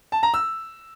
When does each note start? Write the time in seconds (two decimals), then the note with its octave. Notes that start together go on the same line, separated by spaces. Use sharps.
0.12 A5
0.23 A#5
0.34 E6